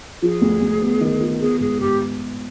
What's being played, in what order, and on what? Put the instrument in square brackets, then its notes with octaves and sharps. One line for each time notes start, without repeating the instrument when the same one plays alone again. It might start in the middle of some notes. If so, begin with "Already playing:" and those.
[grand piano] F3 [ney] G#4
[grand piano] D2
D2
B3
D#3
F4
[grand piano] B3 [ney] G#4
[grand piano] G#2 [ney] G#4
[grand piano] G#2 [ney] G4